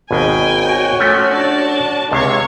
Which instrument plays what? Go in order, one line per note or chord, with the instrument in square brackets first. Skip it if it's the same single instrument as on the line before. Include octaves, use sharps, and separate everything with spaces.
[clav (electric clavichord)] G#1 D#2 B2 [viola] G5 G#5
[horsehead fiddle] F#4 C#5
[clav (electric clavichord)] F3 A3 C#4
[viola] D4 A5
[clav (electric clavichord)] C#2 C3 F5 [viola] C#5 C#6